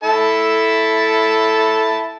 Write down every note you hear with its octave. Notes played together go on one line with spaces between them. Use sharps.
E4 A4 A5